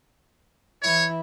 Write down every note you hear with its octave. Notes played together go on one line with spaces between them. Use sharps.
E3 E4 C#5